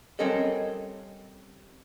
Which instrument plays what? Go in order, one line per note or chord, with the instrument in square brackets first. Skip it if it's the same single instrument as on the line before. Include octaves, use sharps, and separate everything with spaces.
[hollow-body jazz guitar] G3 C4 C#4 A4 A#4 D#5